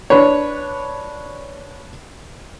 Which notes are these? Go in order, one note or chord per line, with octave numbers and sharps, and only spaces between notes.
D4 B4 C#5